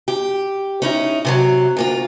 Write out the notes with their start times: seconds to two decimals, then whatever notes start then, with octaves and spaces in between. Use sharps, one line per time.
0.08 G4
0.82 C#4 D#4 E4
1.25 C3 F3 F#3
1.77 D2 A#3 F4